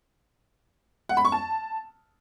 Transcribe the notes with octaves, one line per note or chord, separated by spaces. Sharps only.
F#5
B5
C#6
A5